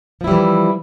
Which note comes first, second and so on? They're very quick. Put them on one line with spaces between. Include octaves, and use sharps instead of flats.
F3 E4 G3 E3